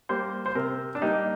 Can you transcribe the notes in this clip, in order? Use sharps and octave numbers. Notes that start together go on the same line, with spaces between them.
G3 A#3 C5
C5
C3 A#4
D4
G3 A#3 D#4